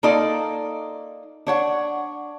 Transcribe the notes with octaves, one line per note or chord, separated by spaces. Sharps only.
A#3 D#4 F4 A4 D5 D#5
D4 C#5 F#5